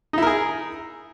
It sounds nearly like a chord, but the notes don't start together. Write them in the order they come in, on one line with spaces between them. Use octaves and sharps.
D#4 E4 A#4 G#4